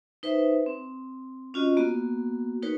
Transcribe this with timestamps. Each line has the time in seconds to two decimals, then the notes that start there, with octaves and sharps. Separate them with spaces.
0.23 D#4 B4 C5 E5
0.66 C4
1.54 C#4 F4 F#4 D#5
1.77 A#3 B3 F#4
2.63 D#4 F#4 A#4 B4 C#5